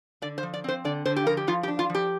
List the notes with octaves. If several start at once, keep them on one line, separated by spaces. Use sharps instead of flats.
D3 D5
C5
F3
D5
C4 C5
D3 D5
D3 C5
G4
F3 A#4
G4
F3 F4
G4
D4
F4
F3
G4